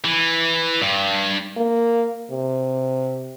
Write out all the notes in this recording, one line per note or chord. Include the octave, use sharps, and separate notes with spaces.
E3
G2
A#3
C3